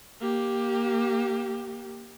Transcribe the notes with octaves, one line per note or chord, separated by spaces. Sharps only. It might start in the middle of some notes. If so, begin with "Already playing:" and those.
A#3 G4